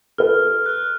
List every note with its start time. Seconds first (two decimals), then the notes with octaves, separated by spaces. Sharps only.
0.18 A4 B4 F6
0.66 F6 F#6